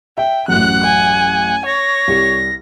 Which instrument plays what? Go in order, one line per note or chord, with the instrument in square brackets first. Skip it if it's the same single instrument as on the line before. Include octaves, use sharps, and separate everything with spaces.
[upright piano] E5 [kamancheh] G5
[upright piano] A1 F#2 [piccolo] F#5 [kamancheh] F#6
[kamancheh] G#5
[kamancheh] C#5 [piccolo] A#6
[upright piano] C2 G3